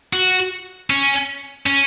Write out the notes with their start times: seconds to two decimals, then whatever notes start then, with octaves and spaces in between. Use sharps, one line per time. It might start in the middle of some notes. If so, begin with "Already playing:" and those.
0.13 F#4
0.90 C#4
1.66 C#4